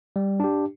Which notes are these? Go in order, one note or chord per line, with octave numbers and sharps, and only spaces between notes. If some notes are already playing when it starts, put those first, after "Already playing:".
G3
D4 G4